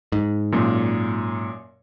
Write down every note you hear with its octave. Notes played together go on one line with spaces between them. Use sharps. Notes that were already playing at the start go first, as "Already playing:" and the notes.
G#2
F#2 A#2